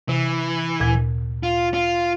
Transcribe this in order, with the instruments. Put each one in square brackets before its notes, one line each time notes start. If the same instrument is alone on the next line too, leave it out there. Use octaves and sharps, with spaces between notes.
[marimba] C3 [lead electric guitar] E3
[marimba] D2 A#2 G#6
[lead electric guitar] F4
F4